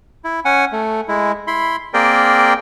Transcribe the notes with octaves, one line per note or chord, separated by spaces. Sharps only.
E4
C#4 F#5 G#5
A3
G#3 E4
E4 B5 C6
A#3 C4 G#4 A#4 D5 G5